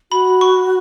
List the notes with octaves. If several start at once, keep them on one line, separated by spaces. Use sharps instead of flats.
F#4 B5
C#6